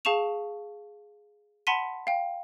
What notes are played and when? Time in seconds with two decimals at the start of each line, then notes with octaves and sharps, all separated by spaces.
0.05 G#4 F5 A5 C#6 E7 F7
1.67 F#5 A5 B5 C6 B6 D#7
2.07 F5 G5